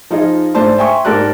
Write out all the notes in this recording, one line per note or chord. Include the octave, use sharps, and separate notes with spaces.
F3 D#4 F4 G#4 D#5
G#2 A3 D4 C5 A5 C6
E5 G5 G#5 C6 C#6
G#2 G4 A4 A#4 D5 F#6